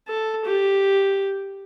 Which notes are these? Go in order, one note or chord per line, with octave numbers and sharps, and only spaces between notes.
A4
G4